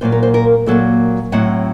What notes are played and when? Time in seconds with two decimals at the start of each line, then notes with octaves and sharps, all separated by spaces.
0.01 A#2 F#3 A#3 C5
0.12 A#4
0.23 C5
0.34 A#4
0.66 A#2 F#3 A#3 A4
1.32 A2 F#3 C4 F#5